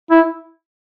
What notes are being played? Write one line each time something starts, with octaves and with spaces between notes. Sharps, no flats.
E4